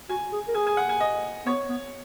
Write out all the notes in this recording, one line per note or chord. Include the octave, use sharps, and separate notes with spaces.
F#4 G#5
G#4
A#4
G#4 G#5
G#5
F#5
G#5
D#5
B3 C#5
B3